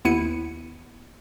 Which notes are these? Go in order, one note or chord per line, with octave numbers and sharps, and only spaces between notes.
D#2 B3 E4 C#7 D#7